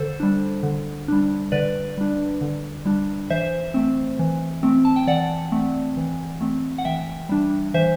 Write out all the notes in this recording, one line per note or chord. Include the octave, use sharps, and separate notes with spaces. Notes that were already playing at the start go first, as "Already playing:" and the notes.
Already playing: D3 A4 C5
G3 D4
D3
G3 D4
D3 B4 D5
G3 D4
D3
G3 D4
E3 C5 E5
A3 C4
E3
A3 C4
A5
G5
E3 D5 F#5
A3 C4
E3
A3 C4
F#5
E3 E5 G5
G3 D4
E3 C5 E5